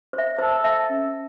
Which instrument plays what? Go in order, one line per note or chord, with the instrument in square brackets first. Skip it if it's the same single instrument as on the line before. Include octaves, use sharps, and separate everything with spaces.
[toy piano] C5
E5
[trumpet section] A4 [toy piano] C5
[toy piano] E5 A5
C#4